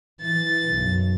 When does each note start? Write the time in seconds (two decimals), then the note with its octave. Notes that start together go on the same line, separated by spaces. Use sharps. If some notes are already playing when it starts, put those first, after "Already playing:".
0.21 E3 A6
0.69 B1 F#2